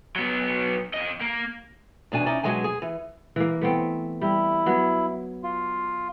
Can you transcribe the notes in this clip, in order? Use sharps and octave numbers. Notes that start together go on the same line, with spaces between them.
F#3 B3
F2 D#5
A#3
E2 B2 D4 G#5
C#4 D#4 E4 D5
B2 F#3 G#3 D4 G#5
G#4
E3
E3 A#3
A3 B3 C4
G3 E4
F#3 B3
F4